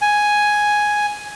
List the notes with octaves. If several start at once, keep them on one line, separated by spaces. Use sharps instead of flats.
G#5